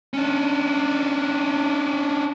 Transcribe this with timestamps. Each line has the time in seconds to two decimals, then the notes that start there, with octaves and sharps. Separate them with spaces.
0.14 C#4 D4